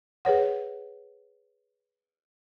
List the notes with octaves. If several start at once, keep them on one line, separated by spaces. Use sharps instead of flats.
G#4 B4 C#5 F#5